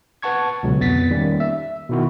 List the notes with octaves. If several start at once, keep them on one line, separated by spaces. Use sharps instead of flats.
B4 F#5 A5 C#6 G#6
C#2 B2 D3 F#3
F2 B3 A6 B6
D#3 G3 A#3 C#4
E5
B2 D#3 E4 F#4